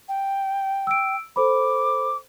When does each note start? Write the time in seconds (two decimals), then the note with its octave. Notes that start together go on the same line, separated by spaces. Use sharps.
0.08 G5
0.87 E6 D7
1.36 A4 C5 B5 D6